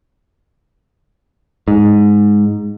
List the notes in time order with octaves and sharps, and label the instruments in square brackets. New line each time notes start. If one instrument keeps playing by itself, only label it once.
[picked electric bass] G#2